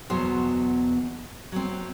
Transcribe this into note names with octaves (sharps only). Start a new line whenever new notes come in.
E2 B2 F#3 C5
F#3 C4